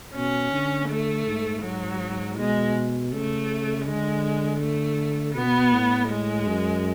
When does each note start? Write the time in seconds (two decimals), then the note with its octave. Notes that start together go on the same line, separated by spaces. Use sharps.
0.15 B2 C#4
0.52 D3
0.89 A3
1.27 G#2
1.63 G#2 F#3
2.37 B2 G#3
3.12 C#3 A3
3.86 D3 G#3
4.61 A3
5.35 B2 B3
5.73 A2
6.09 G#3
6.47 F#2